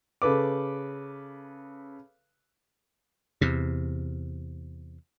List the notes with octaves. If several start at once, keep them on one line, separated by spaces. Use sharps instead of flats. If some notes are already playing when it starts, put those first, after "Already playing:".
C#3 A4 B4 D6
E2 C3